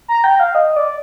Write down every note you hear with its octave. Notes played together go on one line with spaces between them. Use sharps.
A#5
G5
F5
D#5
D5